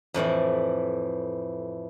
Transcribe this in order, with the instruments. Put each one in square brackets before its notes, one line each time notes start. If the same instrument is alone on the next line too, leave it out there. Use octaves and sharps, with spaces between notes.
[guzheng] F2 A2 E3 D5